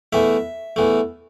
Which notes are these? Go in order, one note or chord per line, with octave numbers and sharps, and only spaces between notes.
E2 E3 A3 E5
E2 E3 A3